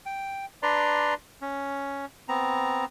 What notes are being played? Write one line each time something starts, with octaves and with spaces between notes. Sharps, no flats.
G5
D4 B4 D5 A#5 C6
C#4
B3 C4 A#5